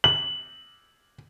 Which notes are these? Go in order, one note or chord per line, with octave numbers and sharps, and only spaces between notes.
F#7